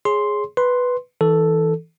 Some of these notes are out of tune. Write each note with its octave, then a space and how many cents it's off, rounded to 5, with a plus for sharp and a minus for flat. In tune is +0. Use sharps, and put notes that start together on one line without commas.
G#4 +0 C#5 +0 C6 +0
B4 +0 C6 +0
E3 -25 A4 +0